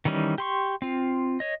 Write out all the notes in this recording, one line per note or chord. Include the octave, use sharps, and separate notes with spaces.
D#3 E3 G3 C#4 D#4
G4 C6 C#6
C4 F4
C#5 D#5